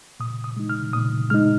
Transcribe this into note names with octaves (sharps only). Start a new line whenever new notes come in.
A#2 D#6
D#6
G#3 D#4
F6
A#2 D#6
G#3 D#4 F6